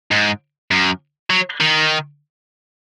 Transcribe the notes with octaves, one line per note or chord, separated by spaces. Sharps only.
G#2
F#2
F#3
D#3